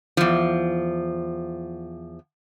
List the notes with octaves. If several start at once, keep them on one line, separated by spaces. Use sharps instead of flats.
E2 F3